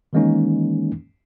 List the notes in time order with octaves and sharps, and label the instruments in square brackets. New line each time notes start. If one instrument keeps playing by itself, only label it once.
[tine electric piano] D#3 E3 G#3 A#3 C#4 D#4